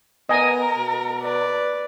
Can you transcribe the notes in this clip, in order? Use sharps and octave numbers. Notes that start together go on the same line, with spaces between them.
B3 A#4 D#5 G#5
B2
B4 D5